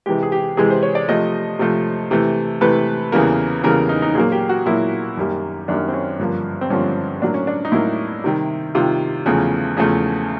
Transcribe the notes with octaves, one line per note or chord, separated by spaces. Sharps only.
C3 E3 G#3 G4
G#4
G4
C3 E3 G#3 G#4
C5
C#5
D5
C3 F3 A3 D#5
C3 F3 A3
C3 E3 A3
C3 E3 A3 B4
E2 C#3 E3 G3 A#3
E2 C#3 E3 G3 A#3 A#4
D#4
D#4
A#2 F#3 A#3 G#4
G4
F#4
A#2 F#3 A#3 E4
F#2 D#3 G3 A#3
F#2 D#3 G3 A#3 D4
C4
C#4
G2 D3 F3 A#3
C4
G2 D3 F3 A#3 C#4
A2 F#3 A#3 D4
C#4
D4
D#4
A2 F#3 A#3 E4
C3 D#3 G3
C3 D#3 G3 F4
E2 C#3 F3 A3
E2 C#3 F3 A3